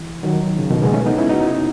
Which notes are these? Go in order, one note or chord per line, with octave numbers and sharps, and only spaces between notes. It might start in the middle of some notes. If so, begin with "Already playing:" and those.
Already playing: E3
D#3 F#3
C#3
B2 D#3
G#3 B3
A3 C#4
B3 D#4
C#4 E4
D#4 F#4